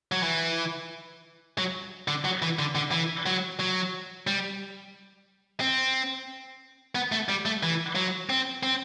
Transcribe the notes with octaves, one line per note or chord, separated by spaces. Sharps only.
F#3
E3
F#3
D3
F#3
E3
D3
D3
E3
F#3
F#3
G3
C4
B3
A3
G3
A3
E3
F#3
C4
C4